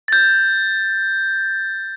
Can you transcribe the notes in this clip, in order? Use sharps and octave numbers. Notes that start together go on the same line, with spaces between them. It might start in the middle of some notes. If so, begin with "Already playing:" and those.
G6 A6